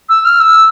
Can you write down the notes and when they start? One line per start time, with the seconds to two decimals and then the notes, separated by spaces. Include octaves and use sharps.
0.09 E6
0.25 F6
0.40 E6